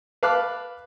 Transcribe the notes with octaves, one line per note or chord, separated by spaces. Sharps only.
B4 F5 A5 D6 F#6